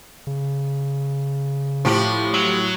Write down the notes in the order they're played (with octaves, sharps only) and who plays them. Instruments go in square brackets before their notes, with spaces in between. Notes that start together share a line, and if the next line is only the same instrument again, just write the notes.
[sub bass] C#3
[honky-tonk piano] A2 F#7 [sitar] F3 G4
[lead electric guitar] F#3